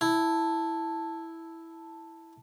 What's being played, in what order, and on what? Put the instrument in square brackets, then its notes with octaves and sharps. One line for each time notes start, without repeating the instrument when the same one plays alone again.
[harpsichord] E4 [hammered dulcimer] A5